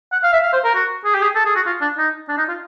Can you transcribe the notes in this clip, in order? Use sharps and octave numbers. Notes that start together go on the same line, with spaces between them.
F#5
F5
E5
F5
C5
A#4
F#4
G#4
G4
G#4
A4
G#4
F#4
F4
D4
D#4
D4
D#4
F4